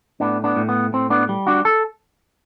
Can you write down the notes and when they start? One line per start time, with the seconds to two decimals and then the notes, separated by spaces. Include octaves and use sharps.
0.20 A2 B3 D4
0.44 B3 D4
0.56 A2
0.69 B3
0.93 A2 C4
1.10 B3 D4
1.29 G3
1.47 D4 F#4
1.65 A4